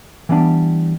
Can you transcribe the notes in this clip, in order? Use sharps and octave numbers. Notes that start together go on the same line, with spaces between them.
E3 G3 B3 D4